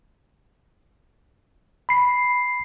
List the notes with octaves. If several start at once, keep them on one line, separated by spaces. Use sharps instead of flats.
B5 C7